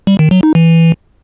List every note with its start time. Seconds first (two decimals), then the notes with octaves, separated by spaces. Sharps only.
0.07 G3
0.19 D#3
0.31 F#3
0.43 D#4
0.55 E3